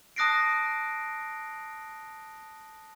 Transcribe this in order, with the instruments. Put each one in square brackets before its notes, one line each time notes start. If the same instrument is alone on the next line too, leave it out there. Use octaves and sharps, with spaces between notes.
[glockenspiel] A5 D#6 F#6 A#6 C7 D7